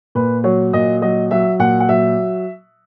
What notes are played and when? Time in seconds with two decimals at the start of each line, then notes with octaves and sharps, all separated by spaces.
0.15 A#2 B4
0.44 F#3 C#5
0.73 A#2 D#5
1.02 F#3 D#5
1.31 F#3 E5
1.59 A#2 F#5
1.80 F#5
1.89 F#3 E5